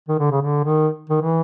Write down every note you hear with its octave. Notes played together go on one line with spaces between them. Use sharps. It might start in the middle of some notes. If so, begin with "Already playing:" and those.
D#3
D3
C#3
D3
D#3
D#3
E3